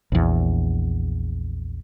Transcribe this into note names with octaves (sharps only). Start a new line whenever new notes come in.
A#1 E2